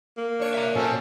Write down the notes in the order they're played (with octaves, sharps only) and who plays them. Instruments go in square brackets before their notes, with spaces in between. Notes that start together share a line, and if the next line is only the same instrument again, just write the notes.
[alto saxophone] A#3
[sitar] D4 C#5
[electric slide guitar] E5 A#5
[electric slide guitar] A#2 F#4 [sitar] F#3 C4 [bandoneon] C#4 A4